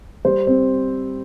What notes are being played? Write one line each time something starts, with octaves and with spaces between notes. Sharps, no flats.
G3 C5
C4